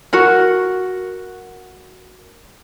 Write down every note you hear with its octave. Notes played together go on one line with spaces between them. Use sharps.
F#4 A#4 F#5